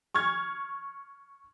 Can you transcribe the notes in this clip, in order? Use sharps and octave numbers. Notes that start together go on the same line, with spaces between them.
C#6 F6 G#6